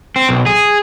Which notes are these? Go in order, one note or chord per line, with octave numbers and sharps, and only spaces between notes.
C4
B1
G#4